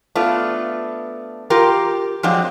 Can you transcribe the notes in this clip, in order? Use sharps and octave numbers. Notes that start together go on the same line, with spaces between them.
A3 B3 D4 F4
F4 G4 A#4
F3 F#3 G#3 C4 D4